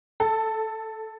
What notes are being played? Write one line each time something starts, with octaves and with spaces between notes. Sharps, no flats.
A4